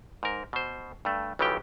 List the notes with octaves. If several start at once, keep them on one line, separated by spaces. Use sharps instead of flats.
G#2 A#4
B2 C5
G2 A3
B1 C#3 E3 F3 G4 G5